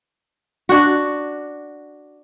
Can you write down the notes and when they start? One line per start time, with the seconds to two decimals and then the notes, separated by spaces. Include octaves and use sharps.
0.69 D4 F#4